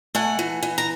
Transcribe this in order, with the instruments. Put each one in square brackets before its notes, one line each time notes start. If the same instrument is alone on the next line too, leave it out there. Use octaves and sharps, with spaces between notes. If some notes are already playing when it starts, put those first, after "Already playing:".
[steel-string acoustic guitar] A3 F#5 G#5
E3
E3
A#5